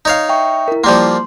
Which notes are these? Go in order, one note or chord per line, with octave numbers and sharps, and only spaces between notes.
D#4 C#5 F5
E5 G5 C#6
E4 A#4
F3 G3 A#3 C6